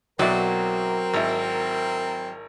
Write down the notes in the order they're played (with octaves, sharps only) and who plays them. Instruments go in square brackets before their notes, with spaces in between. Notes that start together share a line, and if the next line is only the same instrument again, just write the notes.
[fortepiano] B1 E4 D5 [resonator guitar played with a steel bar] F#3 [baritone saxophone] C4 [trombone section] A#4
[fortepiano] G#1 E4